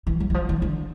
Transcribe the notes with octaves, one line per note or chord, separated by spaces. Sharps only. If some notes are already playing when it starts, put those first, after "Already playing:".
E3
F#3
E3
F3
E3
D3